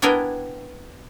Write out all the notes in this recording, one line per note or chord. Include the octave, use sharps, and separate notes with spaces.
B3 D4 E4 A#4 G5 G#5